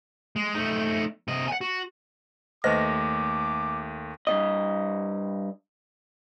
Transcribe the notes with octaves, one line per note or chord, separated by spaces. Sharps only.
G#3
A3 D#4
C3 D#5
F#5 G#5
F#4
D#2 A3 B4 C5 D#5 D6 A#6
G2 B2 D#5